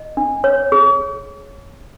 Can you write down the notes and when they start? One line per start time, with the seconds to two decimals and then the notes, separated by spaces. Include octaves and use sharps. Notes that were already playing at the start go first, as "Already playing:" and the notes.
Already playing: D#5
0.17 D4
0.44 C#5
0.72 G#4